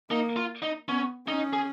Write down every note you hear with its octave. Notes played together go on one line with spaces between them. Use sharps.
A#3 D#4
F4
D#4
B3 C#4
C#4 D#4
G#4